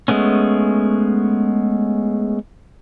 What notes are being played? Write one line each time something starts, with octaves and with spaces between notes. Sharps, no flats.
G#3 A3 B3 C#4